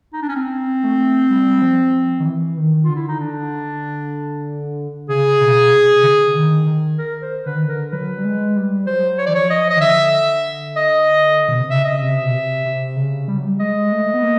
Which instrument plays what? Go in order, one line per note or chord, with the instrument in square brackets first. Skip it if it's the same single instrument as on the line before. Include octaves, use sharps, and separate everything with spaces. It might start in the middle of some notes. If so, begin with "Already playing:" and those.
[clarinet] D#4
D4
C#4
C4
[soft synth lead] A3
G3
F3
D#3
E3
D#3
[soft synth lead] D3 [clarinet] F4
[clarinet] E4
D#4
D4
[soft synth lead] C#3 [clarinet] G#4
[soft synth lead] B2
C3
D3
D3
D#3
D#3
[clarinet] A#4
C5
[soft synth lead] D3 [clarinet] B4
[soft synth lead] D#3
[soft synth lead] D3 [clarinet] A#4
[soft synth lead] F#3 [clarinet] B4
[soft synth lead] G3
G#3
G3
[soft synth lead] F#3 [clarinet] C5
[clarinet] C#5
[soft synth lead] E3 [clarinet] D5
[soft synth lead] F3 [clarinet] C#5
[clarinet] D#5
D#5
[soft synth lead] D#3
[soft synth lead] D3 [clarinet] E5
[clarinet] D#5
[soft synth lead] B2
C3
[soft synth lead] C#3 [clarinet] E5
[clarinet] D#5
[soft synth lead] C3 [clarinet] E5
[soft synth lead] B2
C3
C3
C#3
G3
F#3
G3
[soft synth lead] G#3 [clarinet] D#5
[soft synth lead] A3
B3
A#3